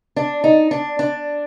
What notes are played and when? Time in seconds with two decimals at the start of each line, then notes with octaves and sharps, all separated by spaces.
0.16 D4
0.44 D#4
0.71 D4
0.99 D4